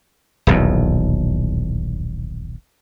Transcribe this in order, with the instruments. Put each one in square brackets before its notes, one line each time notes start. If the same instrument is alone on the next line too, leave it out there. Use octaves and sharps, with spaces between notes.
[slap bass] D#1 B1 E2